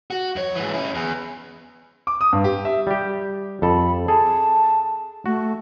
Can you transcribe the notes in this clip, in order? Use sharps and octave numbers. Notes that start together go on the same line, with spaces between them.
F#4
F2 C#5
G#2 E3
C#4 E4
E2
D6
D#6
G2
G4
E5
G3 G4
F2 A4 B5
G#4 A4 A5
A3 F#4